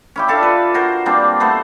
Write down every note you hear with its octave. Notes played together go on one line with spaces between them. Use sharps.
C#4 E4 G4
D4 F4 A4 F5
B4
F#4 A#4 C5
G3 A#3 C4 D4
A3 B3 A4 C5